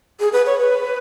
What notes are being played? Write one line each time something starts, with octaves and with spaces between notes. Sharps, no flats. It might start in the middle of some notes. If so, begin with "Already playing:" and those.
G#4
B4
C#5
B4